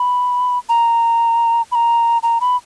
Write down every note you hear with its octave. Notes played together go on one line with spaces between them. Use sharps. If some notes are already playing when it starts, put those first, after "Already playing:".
Already playing: B5
A#5
B5
A#5
A#5
B5